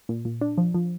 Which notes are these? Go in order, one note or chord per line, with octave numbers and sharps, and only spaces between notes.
A#2
A#2
D4
F3
F3